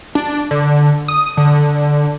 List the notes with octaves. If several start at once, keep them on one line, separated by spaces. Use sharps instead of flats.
D4
D3
D#6
D3